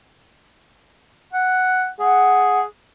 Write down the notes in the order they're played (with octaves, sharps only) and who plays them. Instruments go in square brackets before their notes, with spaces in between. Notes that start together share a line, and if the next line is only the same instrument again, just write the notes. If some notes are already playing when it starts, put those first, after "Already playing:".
[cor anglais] F#5
[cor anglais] G#4 [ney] F#5